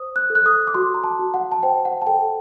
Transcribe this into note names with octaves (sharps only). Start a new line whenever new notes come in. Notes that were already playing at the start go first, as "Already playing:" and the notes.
Already playing: C5 D#6
F#6
A4
F#6
D#6
D6
F#4 C6
A#5
A5
F#4
F#5
A5
C5 G5
F#5
A5
A4 G5